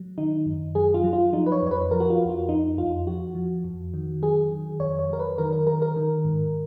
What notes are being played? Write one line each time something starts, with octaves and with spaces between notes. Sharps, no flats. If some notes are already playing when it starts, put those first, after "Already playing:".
Already playing: F#3
D#3 D#4
F#2
F#3 G#4
F4
F#3
F4
F3 D#4
B4
C#5
F2 C#5
B4
F3 A#4
F#4
F4
F2
F4
F2 D#4
F2 F4
F3 F#4
F3
F2
D#3
F#3 G#4
D#3
F2 C#5
C#5
F#3 A#4
B4
D#3 A#4
A#4
D#3 A#4
A#4
D#3
G#2